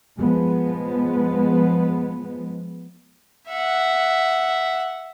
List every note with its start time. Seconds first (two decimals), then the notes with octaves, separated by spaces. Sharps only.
0.19 F3 G#3 B3
3.49 E5 F#5